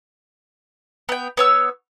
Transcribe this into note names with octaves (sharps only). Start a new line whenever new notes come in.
B3 G5
B3 C#5 E6